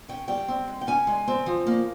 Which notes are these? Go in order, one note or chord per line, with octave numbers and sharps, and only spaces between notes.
C#4 G5
G3 G5
C4
G#3
G5
C#4 G#5
G#3
C4
F3
A#3